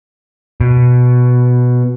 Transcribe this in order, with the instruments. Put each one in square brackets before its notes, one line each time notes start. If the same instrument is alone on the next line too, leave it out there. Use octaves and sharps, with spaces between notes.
[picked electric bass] B2